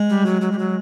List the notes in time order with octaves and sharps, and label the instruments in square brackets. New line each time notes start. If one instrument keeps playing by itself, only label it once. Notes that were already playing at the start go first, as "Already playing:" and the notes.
Already playing: [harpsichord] G#3
[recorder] G3
F#3
F#3
G3
F#3